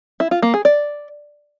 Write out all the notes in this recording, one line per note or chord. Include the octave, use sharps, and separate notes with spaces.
E4
F4
A#3
G#4
D5